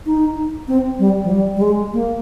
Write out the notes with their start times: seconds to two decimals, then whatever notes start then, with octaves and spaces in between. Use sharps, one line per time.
0.06 D#4
0.68 C4
0.99 G3
1.23 F3
1.30 G3
1.56 G3
1.62 G#3
1.93 A#3